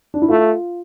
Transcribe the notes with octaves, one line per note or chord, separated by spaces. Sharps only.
D4
E4
A3 F4